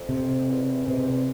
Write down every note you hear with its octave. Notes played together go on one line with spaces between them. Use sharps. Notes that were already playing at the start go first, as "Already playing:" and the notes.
Already playing: F2
C3
E2
G#2 C3
E2